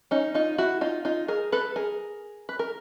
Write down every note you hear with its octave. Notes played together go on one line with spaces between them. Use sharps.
C#4 D#4
D#4 F4
E4 F#4
D#4 F4
D#4 F4
G#4 A#4
A4 B4
G#4 A#4
B4
A#4